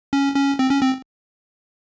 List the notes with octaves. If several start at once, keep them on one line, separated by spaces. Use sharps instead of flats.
C#4
C#4
C4
C#4
C4